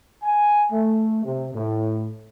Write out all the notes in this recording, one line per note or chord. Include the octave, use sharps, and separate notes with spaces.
G#5
A3
C3
A2